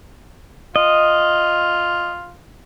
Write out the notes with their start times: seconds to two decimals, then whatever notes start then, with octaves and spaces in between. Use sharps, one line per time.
0.76 F4 D#5